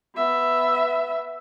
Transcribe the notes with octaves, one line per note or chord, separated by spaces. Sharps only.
B3 E5